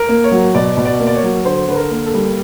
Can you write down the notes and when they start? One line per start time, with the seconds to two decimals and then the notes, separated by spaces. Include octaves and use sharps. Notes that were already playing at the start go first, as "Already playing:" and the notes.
Already playing: A#4
0.09 A#3
0.24 C#5
0.32 F#3
0.55 B2 D5
0.77 B2
0.85 D5
1.00 A#3
1.07 D5
1.15 C#5
1.23 F#3
1.45 D3 C5
1.69 D3 B4
1.76 A#4
1.91 A#3
2.06 A4
2.14 G3